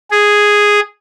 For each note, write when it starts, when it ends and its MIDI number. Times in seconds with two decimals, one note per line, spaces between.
0.11 0.80 68